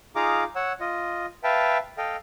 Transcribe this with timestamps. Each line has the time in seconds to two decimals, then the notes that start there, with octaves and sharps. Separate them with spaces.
0.16 D#4 F4 G#4 F5 A#5 D6
0.55 C#5 F#5 E6
0.80 F4 D#5
1.44 B4 E5 F5 G5 A5
1.98 A4 D#5 F5 G5